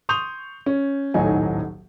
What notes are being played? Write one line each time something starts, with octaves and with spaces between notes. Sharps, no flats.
C6 C#6 D#6 G6 F7
C#4
D#1 B1 A2 F#3 D#4 G#5